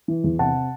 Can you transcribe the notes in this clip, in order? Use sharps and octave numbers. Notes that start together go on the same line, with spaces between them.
E3
E2
C3 F#5 A5